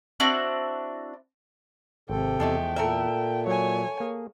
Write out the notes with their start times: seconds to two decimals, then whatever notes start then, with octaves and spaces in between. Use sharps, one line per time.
0.20 C4 D4 E4 F#4
2.10 G#1 C3 A4 G5
2.40 E2 F3 G#3 A3
2.76 A#2 A3 A#4 E5
3.47 F#3 C#5 G#5
4.00 A#3 G#4